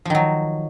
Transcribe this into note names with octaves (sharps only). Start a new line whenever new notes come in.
D#3 F3 F#3